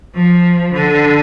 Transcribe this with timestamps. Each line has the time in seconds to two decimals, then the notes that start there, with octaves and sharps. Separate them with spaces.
0.15 F3
0.73 D3